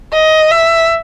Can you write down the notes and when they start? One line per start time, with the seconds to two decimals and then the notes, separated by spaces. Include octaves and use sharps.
0.13 D#5
0.51 E5